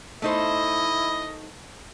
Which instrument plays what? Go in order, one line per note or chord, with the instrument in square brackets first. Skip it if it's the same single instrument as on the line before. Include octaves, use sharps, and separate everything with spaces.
[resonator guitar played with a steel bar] A3 D#4 C5 [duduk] E4 [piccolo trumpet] D#5